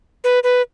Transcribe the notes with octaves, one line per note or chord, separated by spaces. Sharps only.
B4
B4